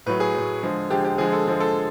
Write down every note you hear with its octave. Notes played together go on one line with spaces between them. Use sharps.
A2 F#3 B4
G#4
A2 F#3
D3 F3 G#3
D3 F3 G#3 G4
G4
D3 F3 G#3 G#4
A4
D3 F3 G#3
A4